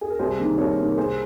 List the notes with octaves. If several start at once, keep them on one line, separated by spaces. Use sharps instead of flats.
G#4
A#4
C2 G#4 C5
C3 D#3 A#3
C2 A#4 C#5
C3 D#3 A#3
C2 G#4 C5